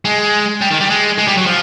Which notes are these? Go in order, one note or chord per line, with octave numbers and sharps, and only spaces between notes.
G#3
G3
D#3
G3
G#3
G#3
G3
F#3
F3